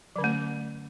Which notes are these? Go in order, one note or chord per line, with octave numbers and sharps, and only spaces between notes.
D3 F#3 A3 C#4